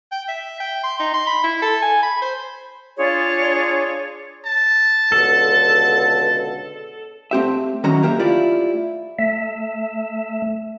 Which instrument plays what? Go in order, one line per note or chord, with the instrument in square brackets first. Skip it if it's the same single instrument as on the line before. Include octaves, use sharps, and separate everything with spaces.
[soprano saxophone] G5
E5
G5
C6
D#4
C6
B5
E4
A4
G#5
B5
C5
[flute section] D4 F4 G#4 C#5
[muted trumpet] A5
[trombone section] C#2 B2 D3 [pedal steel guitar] A4
[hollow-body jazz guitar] A3 C4 G4 E5
D#3 E3 F#3 C#4 A#5
A#3 G4 A#4 E5
A3 E4 F4 G4 D5
[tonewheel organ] A3 E5